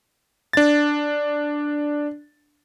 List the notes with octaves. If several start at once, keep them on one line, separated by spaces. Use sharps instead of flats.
D4 A6